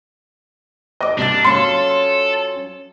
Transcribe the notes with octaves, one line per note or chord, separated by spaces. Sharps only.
D#5 D6
C2 D4 A6
F#3 C#4 F4 A4 C6